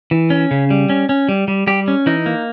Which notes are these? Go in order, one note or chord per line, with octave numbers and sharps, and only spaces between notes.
E3
C#4
C#3
G3
C#4
C#4
G3
G3
G3 G4
C#4
E3 D#4
A#3